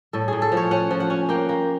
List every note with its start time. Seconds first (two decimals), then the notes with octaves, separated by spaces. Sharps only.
0.13 A2 A4
0.28 A2 G#4
0.42 A4
0.52 F3
0.57 C#5
0.71 C#4 F#5
0.91 F3
1.00 F#5
1.10 C#4
1.29 A#3 G5
1.49 A#3